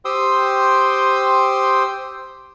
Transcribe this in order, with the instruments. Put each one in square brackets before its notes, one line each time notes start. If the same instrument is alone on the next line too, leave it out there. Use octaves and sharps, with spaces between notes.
[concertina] G4 C5 G5 C6 D#6 E6